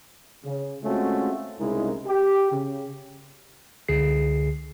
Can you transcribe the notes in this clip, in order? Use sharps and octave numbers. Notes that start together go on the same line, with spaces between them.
C#3
G#3 A3 C4 C#4 F4 F#4
C2 C#3 G#3 D#4 E4 A#4
G4
C#3
C#2 D3 G#4 C7